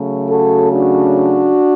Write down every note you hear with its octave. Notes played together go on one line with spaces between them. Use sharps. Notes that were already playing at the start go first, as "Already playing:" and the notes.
Already playing: C#3 F#3 A3
F#4 A4
D4 F#4